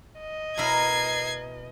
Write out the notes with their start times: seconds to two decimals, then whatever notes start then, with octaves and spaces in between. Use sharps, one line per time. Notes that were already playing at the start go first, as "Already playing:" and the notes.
0.20 D#5
0.58 B2 E4 A#4 G#6 C7